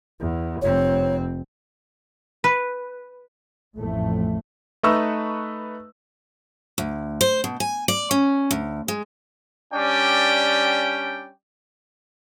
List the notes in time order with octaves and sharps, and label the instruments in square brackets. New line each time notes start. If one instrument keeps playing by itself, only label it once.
[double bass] E2
[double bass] F1 C4 [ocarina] C#5
[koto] B4
[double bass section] A1 F2 A2 A3
[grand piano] A3 D#4 B4 C#6 E6
[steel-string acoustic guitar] D2
C5
B2
G#5
D5
C#4
D2
G#3
[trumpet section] G3 C#4 D4 D5 G5